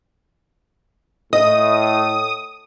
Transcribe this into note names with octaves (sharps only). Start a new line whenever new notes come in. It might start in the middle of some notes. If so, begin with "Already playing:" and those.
A2 D#5 D#6